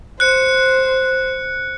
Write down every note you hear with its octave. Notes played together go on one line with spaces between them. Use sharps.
C5 F#6 C#7